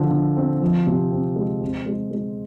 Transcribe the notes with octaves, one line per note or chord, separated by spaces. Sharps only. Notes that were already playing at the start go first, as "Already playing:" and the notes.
Already playing: D3 F3
D3
C4
F3
C3
C4
G#3
C4
G#3
G#3